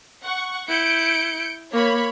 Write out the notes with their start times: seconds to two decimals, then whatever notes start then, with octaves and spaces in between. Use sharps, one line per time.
0.22 F#5 C#6
0.69 E4 G6 C#7 D7
1.72 A#3 C#5 B5